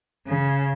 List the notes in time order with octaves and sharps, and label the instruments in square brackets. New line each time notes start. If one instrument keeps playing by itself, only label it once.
[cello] C#3